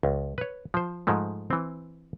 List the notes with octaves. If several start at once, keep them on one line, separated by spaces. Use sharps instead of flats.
C#2
B4 C#5
F3 C5
G#2 F3 G#3 A3
E3 C4